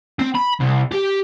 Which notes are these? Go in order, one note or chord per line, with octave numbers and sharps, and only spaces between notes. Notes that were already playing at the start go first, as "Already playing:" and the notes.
C4
B5
C2
G4